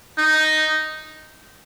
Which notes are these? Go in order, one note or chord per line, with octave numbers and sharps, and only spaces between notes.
D#4